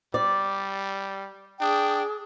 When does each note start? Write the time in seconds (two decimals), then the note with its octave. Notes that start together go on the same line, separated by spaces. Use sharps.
0.14 G3 D5
1.61 D4 G#4 G5 D#6